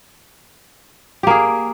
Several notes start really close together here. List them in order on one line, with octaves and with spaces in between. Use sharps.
G4 A#3 G#4